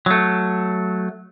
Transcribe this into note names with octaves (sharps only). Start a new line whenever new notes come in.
F#3 A3